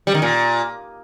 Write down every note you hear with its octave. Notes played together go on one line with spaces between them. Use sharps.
G3
D#3
A#2